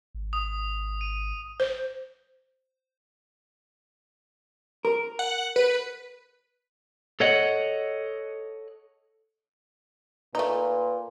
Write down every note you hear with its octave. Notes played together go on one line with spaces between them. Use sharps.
G#1
D#6
D#7
C5
A#4
F#5
B4
A4 C#5 D#5 F#5
A#2 A3 D#4 B4